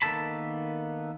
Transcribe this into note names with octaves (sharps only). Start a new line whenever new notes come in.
D#3 A#3 B3 A4 A5 B5